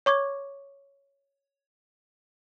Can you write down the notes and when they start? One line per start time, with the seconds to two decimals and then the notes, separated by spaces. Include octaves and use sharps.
0.06 C#5 C#6 D6 G#6